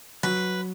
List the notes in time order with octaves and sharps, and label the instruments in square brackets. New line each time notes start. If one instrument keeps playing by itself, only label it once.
[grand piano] F#3 [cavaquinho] B4